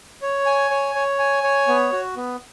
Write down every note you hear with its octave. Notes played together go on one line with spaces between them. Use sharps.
C#5
G#5
C#5
C#5
G#5
C#5
B3
F#4
B3